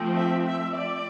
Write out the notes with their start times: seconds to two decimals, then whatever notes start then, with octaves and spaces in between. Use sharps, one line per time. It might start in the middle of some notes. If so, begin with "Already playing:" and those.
Already playing: F3 A3 C4
0.15 E5
0.45 E5
0.75 D5